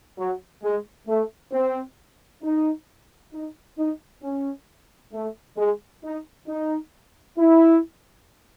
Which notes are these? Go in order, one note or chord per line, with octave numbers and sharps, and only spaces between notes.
F#3
G#3
A3
C4
D#4
D#4
D#4
C#4
A3
G#3
D#4
D#4
E4